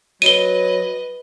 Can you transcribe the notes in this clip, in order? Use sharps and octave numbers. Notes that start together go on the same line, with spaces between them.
F#3 B4 D#5 D#7 G7